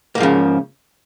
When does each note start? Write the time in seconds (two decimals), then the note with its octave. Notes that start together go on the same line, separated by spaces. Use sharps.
0.15 A#3
0.18 G#2
0.20 F3
0.23 C#3